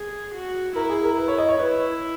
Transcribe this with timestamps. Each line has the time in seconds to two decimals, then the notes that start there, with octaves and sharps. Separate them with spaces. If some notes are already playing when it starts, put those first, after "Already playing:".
Already playing: G#4
0.34 F#4
0.76 E4 A#4
0.90 G#4
1.04 A#4
1.17 B4
1.28 C#5
1.38 D#5
1.49 C#5
1.59 E4 B4